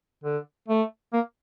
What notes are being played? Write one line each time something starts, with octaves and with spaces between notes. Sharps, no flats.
D3
A3
A#3